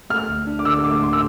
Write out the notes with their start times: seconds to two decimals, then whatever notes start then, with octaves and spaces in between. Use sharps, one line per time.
0.10 A3 F6
0.29 D2
0.47 D4
0.59 D6
0.65 D3 E6
0.84 A3 D6
1.03 D2 C6
1.13 E6